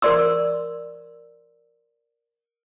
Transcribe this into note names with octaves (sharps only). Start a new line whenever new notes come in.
A#4 C5 D5 C6 E6